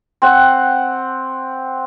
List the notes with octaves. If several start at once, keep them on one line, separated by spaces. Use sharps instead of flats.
C4 F#5